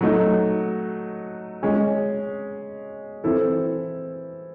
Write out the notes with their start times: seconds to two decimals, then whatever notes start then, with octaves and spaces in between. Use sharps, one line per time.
0.01 F#3 A3 D#4 F#4
1.63 G#3 C#4 G#4
3.24 E3 C4 E4 A4